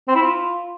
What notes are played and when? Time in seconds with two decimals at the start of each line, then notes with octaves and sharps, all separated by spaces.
0.08 C4
0.15 E4
0.22 F4